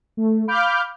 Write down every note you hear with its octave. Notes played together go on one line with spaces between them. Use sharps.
A3
F5 B5 D6 F6 G6